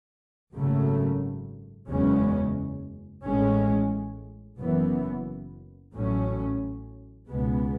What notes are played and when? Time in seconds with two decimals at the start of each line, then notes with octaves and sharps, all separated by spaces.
0.53 G#1 F#2 C#3 F#3 A3
1.88 F#1 E2 C#3 G#3 C#4
3.24 A1 A2 G#3 C#4
4.59 F#1 F#2 E3 B3
5.94 A1 A2 F#3 C#4
7.29 C#2 B2 G#3 B3